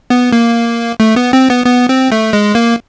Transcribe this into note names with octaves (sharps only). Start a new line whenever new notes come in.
B3
A#3
A3
B3
C4
B3
B3
C4
A3
G#3
A#3